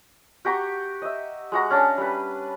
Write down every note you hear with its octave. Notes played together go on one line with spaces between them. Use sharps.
F#4 G4 A#5 C#6
D#5 E5
G#3 F#4 A#5
C#4 D4 A5 A#5
G3 B4